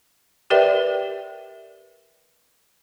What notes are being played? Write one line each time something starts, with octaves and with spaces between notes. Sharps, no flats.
G4 A#4 B4 D5 E5 G5